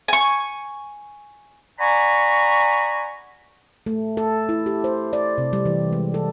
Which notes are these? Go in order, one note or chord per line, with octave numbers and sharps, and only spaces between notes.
G#5 C#6
D5 F#5 G#5 A#5 B5 C#6
A3
A4
E4
G4
C5
D5
C3
G3
E3
G#3
A4